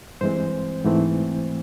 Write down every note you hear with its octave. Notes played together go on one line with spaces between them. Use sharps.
G2 E3 G#3 C4 C5
G#2 E3 A3 C4